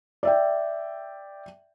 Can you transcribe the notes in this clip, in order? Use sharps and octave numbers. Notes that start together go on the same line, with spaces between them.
D5 E5 G5